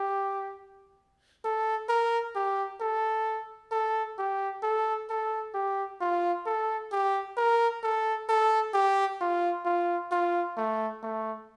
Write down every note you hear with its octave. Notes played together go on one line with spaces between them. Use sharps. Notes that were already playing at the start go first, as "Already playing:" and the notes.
Already playing: G4
A4
A#4
G4
A4
A4
G4
A4
A4
G4
F4
A4
G4
A#4
A4
A4
G4
F4
F4
F4
A3
A3